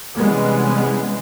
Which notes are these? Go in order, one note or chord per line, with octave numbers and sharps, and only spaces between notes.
C3 E3 G3 G#3 B3 C#4